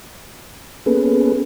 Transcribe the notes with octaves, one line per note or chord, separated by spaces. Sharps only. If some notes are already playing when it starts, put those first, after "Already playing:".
A#3 B3 C#4 G#4 A4 B4